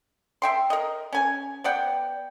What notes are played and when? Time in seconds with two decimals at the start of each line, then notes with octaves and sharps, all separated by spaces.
0.42 E5 G5 C6
0.70 A#4 D#5
1.13 C#4 G#5
1.64 B3 D5 F#5 G5